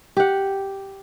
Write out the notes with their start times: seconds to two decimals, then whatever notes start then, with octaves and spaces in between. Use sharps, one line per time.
0.17 G4 F#5